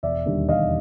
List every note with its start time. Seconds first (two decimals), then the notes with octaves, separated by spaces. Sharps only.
0.03 E1 D5 E5
0.26 D#2 D3 G3
0.49 E1 D#5 F5